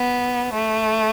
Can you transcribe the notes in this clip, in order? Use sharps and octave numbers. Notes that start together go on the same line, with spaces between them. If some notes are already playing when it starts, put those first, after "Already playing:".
Already playing: B3
A3